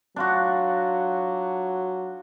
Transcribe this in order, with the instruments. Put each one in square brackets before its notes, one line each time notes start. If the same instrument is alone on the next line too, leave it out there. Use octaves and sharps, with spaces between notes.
[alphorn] F#3 [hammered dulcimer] D4 F4 F#4